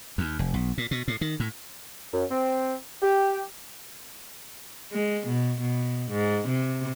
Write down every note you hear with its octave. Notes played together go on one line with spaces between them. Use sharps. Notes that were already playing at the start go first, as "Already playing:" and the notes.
D#2
F1
B1
A#2
B2
A2
D#3
A2
F#2
C4
G4
G#3
B2
B2
G#2
C3